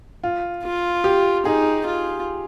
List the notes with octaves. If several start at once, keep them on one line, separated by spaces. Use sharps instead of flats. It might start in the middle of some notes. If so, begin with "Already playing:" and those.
F4
F4
G4
D#4 G#4
F4